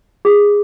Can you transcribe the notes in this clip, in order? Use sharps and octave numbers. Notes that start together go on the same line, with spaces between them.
G#4